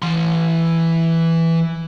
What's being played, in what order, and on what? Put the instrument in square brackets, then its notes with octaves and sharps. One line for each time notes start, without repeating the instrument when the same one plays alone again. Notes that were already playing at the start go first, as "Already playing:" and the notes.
[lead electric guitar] E3 C6